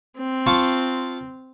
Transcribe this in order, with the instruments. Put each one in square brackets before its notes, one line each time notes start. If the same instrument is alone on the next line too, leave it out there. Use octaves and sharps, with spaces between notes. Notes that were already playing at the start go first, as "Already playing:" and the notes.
[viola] C4
[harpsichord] F4 A5 C#6